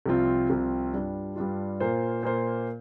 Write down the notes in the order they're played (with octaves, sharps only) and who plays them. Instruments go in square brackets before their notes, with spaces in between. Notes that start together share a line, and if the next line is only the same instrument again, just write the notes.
[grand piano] C2 C3 F3 C4 F4
C2 C3 F3 C4 F4
G2 G3 D4 F4
G2 G3 D4 F4
A#2 A#3 F4 C5
A#2 A#3 F4 C5